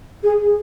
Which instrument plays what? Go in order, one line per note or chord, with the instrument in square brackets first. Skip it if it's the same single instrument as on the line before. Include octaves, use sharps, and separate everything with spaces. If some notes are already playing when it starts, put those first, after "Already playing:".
[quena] G#4